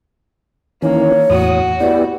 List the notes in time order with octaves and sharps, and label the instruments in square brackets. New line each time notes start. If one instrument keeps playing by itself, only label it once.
[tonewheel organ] D#3 E3 C#4 [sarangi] A#3 [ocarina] C#5
[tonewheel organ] E2 A2 D#6 [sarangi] F#4
[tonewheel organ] B3 E4 G4 [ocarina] D5